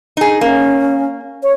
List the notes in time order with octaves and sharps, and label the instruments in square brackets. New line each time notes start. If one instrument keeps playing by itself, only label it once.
[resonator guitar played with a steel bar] D#4 G#4
[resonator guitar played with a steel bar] A#3 [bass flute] C#4
[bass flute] C#5